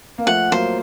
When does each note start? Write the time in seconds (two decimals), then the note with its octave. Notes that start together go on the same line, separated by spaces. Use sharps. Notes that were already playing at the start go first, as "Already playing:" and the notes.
0.18 A#3
0.26 F3 A3 F#5
0.51 F#3 A#3 C5